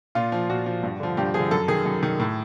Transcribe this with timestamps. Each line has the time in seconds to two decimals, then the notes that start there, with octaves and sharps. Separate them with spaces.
0.15 A#2 F4
0.32 F3
0.49 A#2 F#4
0.66 F3
0.83 G2
1.00 D3 F3
1.17 G2 G4
1.34 D3 F3 G#4
1.51 F#2 A4
1.68 D#3 G#4
1.86 F#2
2.03 D#3
2.19 A2